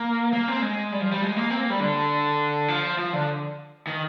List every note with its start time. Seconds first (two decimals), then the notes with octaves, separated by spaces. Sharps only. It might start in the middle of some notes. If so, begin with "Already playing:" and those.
Already playing: A#3
0.33 A#3
0.48 C4
0.62 G#3
0.92 G3
1.01 F3
1.12 G3
1.22 G#3
1.36 A#3
1.50 C4
1.60 A#3
1.70 G3
1.80 D3
2.68 F3
2.99 F3
3.13 D3
3.87 D#3